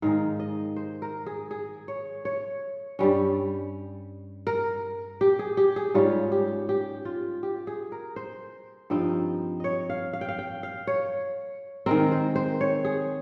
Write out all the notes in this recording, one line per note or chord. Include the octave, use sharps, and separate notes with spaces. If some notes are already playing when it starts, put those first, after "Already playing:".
G#2 D#3 G#3 D#4 F5
D#5
C5
A#4
G#4
G#4
C#5
C#5
G2 G3 C#4
A#4
G4
G#4
G4
G#4
G#2 G3 C#4 F4
G4
G4
F4
G4
G#4
A#4
C5
G2 F3 C4 D#4
C#5 D#5
F5
F5
G5
F5
G5
F5
C#5
D#3 G#3 C4 A#4
C5
C5
C#5
G#4